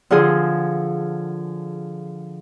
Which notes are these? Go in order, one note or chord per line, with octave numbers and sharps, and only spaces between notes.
D3 F3 F4 G#4